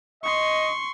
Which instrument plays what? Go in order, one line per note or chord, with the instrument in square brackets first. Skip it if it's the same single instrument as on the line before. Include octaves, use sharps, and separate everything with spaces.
[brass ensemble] D#5 [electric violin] C6 C#6